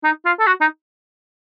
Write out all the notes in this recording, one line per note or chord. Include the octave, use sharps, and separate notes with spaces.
D#4
F4
A4
F#4
D#4